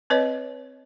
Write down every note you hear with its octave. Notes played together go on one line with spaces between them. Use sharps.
C4 B4 C#5 D#5